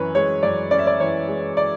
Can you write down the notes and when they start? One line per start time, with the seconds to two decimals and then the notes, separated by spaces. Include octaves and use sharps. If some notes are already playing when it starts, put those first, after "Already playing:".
Already playing: F#2 E3 C#4 B4 C#5
0.15 G#3 C#5
0.43 F#2 D5
0.71 C#4 D5
0.79 E5
0.87 D5
1.00 E3 C#5
1.28 G#3
1.57 D5